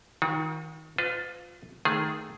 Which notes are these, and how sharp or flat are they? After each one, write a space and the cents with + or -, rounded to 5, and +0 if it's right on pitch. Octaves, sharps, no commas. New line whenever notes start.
D#3 +25 F#4 -45
F4 +15 B4 +45 D#5 +0
D#3 +0 A3 +0 G#4 +0